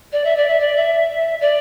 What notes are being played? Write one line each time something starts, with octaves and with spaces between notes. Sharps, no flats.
D5
E5
D5
E5
D5
E5
D5